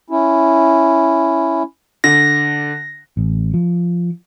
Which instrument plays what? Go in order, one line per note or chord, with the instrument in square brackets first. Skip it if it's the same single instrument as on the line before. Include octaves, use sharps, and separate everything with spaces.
[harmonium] C#4 E4
[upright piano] D3 [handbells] A#6
[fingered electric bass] A1
F3